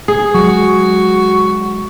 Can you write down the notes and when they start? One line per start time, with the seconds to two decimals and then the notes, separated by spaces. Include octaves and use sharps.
0.08 G#4
0.34 F#3 G#3 F#4